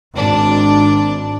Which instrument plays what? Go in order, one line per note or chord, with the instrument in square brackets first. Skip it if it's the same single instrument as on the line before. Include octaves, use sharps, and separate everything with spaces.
[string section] G#1 D4